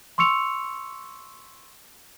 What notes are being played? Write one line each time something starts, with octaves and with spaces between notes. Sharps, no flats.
C6 C#6 E6 C#7 F7